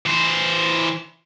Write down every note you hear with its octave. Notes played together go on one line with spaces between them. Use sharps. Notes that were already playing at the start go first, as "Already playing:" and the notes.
E3 C5